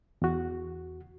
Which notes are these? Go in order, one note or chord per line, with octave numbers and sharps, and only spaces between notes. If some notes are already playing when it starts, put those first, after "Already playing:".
E2 F#4